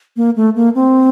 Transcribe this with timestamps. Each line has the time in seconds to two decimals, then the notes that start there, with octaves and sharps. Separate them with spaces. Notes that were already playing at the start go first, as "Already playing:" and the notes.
0.17 A#3
0.36 A3
0.56 A#3
0.75 C4